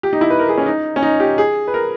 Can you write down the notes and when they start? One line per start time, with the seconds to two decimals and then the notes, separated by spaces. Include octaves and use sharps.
0.03 G4
0.13 D#4
0.21 E4
0.30 B4
0.39 A#4
0.48 G#4
0.58 C#4
0.66 D#4
0.96 C#4
1.02 D#4
1.20 G4
1.38 G#4
1.68 B4
1.74 A#4